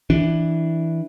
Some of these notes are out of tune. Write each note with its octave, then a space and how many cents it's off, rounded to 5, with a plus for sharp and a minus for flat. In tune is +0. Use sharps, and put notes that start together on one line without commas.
E3 -10 D4 +0